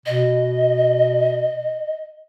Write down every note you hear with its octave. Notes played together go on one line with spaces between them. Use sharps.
B2 D#5